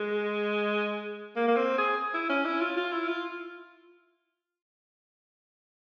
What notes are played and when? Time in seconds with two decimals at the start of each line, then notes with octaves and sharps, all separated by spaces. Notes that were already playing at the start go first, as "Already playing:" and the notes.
Already playing: G#3
1.36 A#3
1.48 A#3
1.57 C4
1.78 G#4
2.14 E4
2.29 C#4
2.45 E4
2.61 F4
2.77 F4
2.92 E4
3.08 F4